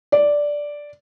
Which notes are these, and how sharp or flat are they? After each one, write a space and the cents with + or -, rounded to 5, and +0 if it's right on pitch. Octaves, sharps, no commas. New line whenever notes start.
D5 -5